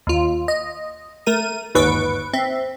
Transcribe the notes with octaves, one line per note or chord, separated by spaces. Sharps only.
D#2 F4
D#5
A3 A#4 D#7
G1 D#2 G#2 B4 C#6 D7
C4 E5